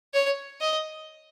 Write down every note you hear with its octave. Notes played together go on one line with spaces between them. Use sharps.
C#5
D#5